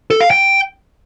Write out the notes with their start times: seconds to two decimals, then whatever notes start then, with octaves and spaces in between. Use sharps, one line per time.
0.10 A4
0.21 F5
0.31 G5